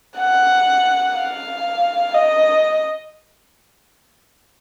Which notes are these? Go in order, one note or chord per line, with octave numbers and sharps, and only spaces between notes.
F#5
F5
D#5